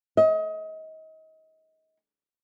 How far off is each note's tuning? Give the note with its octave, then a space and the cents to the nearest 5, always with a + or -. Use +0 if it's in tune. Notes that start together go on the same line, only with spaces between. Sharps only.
D#5 +30